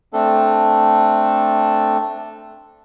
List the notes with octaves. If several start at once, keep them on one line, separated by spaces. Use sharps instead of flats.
A3 C4 D4 A4